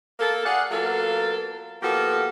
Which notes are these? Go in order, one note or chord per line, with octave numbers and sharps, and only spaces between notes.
A#3 A4
G#4 D5 F5 F#5
F#3 A#3 B3 F4 A4 F5
F3 A#3 B3 F#4 G4 A4